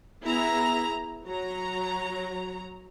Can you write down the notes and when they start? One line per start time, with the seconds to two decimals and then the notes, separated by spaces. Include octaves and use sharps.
0.22 B3 E4 G#4 A#5
1.26 F#3 A#5